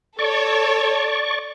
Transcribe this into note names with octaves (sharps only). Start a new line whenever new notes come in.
A4 C#5 D5 C#6